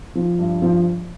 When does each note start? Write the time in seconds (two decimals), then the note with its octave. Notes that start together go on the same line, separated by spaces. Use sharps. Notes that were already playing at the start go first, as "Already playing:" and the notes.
0.15 F3
0.39 G2
0.62 F3